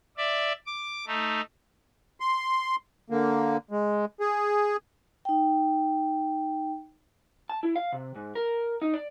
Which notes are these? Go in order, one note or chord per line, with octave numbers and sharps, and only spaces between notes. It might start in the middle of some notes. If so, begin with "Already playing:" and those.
D5 E5
D6
A3 D#4
C6
D3 A#3
G#3
G#4
D#4 G5
A5
E4
F5
C3
G#2
A#4
D#4
D5